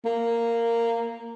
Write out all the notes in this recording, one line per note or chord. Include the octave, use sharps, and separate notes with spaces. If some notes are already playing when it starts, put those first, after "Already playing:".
A#3